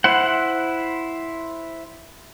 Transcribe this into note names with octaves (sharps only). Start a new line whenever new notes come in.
E4 C5 F#5